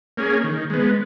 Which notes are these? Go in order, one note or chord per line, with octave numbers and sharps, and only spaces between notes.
A#3 C#4 G#4
D#3
G#3 B3